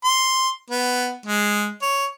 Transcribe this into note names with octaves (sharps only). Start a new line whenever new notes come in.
C6
B3
G#3
C#5